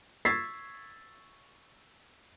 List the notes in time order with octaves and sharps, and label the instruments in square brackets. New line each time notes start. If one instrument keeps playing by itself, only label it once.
[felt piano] C#6 E6 G#6 A6 B6 C7